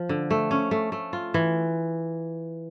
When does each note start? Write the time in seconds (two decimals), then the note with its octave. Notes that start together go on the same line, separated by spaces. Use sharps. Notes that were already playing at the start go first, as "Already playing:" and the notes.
Already playing: F3
0.09 D3
0.31 A3
0.51 C#4
0.71 A3
0.92 A3
1.13 F4
1.34 E3